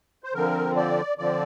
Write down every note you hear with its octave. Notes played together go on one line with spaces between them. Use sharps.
C5
D3 F3 C4 A#4
D5
D3 F3 C4 D5